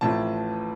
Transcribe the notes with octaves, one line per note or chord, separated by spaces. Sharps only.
A1 A2 F3 A5